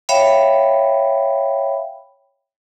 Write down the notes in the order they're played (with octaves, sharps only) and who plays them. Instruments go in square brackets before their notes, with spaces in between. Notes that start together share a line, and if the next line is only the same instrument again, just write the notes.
[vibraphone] C#5 E5 F5 G5 B5